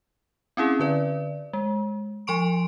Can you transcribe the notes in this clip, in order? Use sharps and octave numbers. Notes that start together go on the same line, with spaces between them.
C4 C#4 E4 G#4
D3 B4 D5
G#3
F3 G#5 C6 C#6 D7